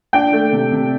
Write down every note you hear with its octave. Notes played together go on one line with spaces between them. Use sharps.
D4 G5
A3
C3
C3